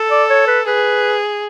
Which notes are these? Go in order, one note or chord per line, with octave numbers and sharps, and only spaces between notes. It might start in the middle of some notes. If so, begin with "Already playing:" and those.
Already playing: A4
D5
C#5
B4
G#4 B4